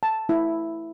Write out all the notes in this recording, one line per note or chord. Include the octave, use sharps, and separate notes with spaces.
A5
E4